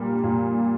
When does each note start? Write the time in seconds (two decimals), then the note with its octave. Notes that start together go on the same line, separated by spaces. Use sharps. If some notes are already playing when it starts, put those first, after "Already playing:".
Already playing: A#2 G3 A#3
0.23 A#2